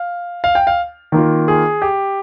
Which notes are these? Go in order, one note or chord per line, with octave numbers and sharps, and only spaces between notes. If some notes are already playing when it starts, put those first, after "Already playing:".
Already playing: F5
F5
G5
F5
D#3 A#3 F4
G#4
G4